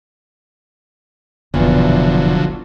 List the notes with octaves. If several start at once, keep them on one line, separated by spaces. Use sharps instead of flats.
F1 B1 E2 D3 F3 F#3